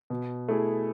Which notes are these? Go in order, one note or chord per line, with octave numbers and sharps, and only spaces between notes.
B2
A3 E4 G#4